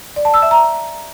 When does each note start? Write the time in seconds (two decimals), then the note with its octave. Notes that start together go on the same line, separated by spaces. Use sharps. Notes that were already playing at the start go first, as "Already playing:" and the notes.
0.16 D5
0.25 A5
0.34 E6
0.42 E5
0.51 A#5